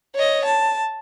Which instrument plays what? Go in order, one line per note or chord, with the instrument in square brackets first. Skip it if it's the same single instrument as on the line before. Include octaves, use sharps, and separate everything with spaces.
[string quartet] C#5 D#5
A5